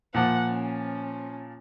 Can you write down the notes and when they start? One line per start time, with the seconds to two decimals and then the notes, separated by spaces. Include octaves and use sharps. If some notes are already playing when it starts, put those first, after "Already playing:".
0.14 A#2 F3 F#5
0.51 C#4